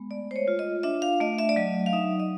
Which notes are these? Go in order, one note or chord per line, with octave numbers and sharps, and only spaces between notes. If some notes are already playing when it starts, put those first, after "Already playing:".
Already playing: G#3 B3
A3 D5
C5
C#5
F4
D#5
D4 E5
F5
A3 D#5
E5
D5
F#3 D#5
F5
D#4 E5
D#5